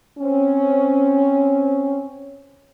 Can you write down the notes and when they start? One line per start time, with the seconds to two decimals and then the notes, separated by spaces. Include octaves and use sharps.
0.19 C4 C#4